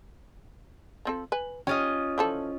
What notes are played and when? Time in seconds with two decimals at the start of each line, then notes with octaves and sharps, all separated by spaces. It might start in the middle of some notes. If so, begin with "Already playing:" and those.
1.05 F3 C4 A4
1.32 B4 G#5
1.67 C#4 F4 G4 D#5
2.18 E3 F3 A4